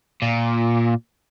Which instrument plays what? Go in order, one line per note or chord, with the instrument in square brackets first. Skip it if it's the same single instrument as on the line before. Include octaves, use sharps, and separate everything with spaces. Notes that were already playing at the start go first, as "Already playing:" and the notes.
[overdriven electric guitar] A#2